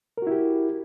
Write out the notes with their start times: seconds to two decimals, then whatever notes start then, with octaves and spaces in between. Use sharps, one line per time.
0.18 A#4
0.22 F#4
0.27 E4
0.31 G4